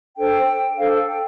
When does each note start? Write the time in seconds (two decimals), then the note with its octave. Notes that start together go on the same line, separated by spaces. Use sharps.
0.16 D4 A4 C5 G5
0.76 D4 A4 C5 F5
1.06 G5